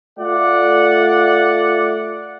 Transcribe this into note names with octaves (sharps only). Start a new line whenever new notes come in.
A3 F4 D5 F#5